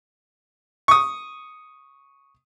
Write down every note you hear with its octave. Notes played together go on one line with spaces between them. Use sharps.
C#6 D#6